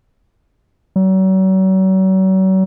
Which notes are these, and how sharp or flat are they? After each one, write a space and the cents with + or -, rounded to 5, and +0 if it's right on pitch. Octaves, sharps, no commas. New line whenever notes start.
F#3 +40